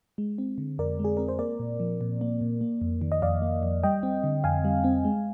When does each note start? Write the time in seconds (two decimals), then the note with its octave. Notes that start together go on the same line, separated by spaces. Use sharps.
0.18 G#3
0.38 C4
0.58 D3
0.78 F2 A#4 D5
0.99 G#3
1.05 G#4
1.17 C4 A#4
1.28 C5
1.39 A#3 A#4 D5
1.59 A#2
1.80 F3
2.01 A#2
2.21 A#3
2.41 A#2
2.61 A#3
2.81 F2
3.01 D#3
3.12 D#5
3.22 F2 D5 F5
3.42 A#3
3.63 F2
3.83 G3 D#5 G5
4.03 C4
4.24 D3
4.44 F2 F5 G#5
4.64 G3
4.84 C4
5.05 G#3